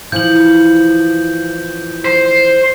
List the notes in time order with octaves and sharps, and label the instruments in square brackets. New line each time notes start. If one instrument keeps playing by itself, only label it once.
[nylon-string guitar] E3 F3 [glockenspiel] G6 F#7
[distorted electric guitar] C5